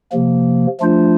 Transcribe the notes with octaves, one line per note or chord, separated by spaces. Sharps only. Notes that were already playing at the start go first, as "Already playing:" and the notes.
C3 F3 A#3
F3 A3 D4 F4 C5